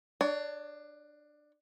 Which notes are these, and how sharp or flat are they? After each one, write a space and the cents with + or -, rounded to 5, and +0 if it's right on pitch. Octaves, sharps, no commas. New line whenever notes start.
D4 +20 C#5 +45